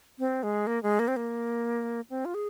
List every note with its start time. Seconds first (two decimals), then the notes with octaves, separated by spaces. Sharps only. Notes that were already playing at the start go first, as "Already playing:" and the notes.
0.19 C4
0.43 G#3
0.67 A#3
0.83 G#3
0.99 A#3
1.08 C4
1.16 A#3
2.10 C4
2.25 F4
2.34 G#4